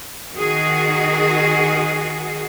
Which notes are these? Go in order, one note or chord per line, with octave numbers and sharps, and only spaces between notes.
D#3 F#4 G#4